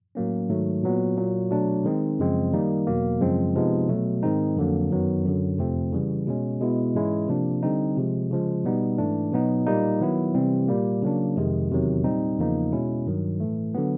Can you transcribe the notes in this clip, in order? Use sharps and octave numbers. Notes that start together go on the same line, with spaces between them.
A2 F#3 A#3 C#4
G#2 D#3 F#3 A3
A#2 F#3 B3
A#2 F#3 A#3
B2 F#3 A3 D4
D#3 G#3 C4 D#4
F#2 C#3 F3 G#3 C4
D#3 G3 A#3 D#4
E2 B2 F#3 A#3
F#2 C#3 F3 G#3 C4
C3 F3 G#3 B3 D#4
B2 F#3 A3
G#2 D#3 G#3 C4 D#4
F2 D3 F#3 A#3
F#2 D#3 F#3 B3
F#2 D3 F#3
F2 C3 F3 A3 C4
C#3 E3 G3
B2 G#3 C#4
B2 G#3 B3 E4
G#2 E3 G#3 C#4 E4
C3 F3 A#3 D4
D3 G3 C4 D#4
C3 F3 G#3
C#3 F3 G#3
B2 G3 B3 D#4
G#2 E3 A3 D4
B2 F#3 B3 D#4
A#2 G3 A#3 D#4
D#3 F#3 B3 E4
C3 E3 G3 C4
A#2 G3 A#3
C#3 F#3 A#3 D4
F2 C3 D#3 G#3
E2 C3 D#3 F#3
A#2 G3 C4 D#4
E2 C#3 F3 A#3 D#4
B2 G#3 C#4 E4
G2 D#3 F#3
A2 E3 A3
D3 F#3 B3